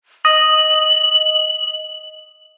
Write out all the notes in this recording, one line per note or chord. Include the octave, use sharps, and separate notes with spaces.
D#5 F#7